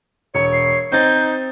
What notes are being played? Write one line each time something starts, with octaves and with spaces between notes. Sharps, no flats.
E1 C#5 C#7
C7
C4 D#4 G6 A6